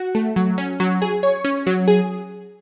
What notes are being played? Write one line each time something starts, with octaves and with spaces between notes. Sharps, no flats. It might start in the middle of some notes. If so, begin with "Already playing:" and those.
Already playing: F#4
A3
F#3
C#4
F#3
G#4
C#5
C#4
F#3
G#4